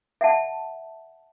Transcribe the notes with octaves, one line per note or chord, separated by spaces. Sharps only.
E5 F#5 A5